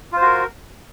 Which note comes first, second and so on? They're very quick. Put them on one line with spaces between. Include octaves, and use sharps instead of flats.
F4 C5 F#4 A#4